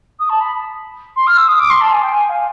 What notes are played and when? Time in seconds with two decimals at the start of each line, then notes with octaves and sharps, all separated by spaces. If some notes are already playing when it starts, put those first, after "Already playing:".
0.19 D#6
0.29 A5
0.40 B5
1.16 C6
1.27 F6
1.37 E6
1.48 D#6
1.59 D6
1.70 C6
1.81 A5
1.91 G#5
2.02 G5
2.12 G#5
2.29 F5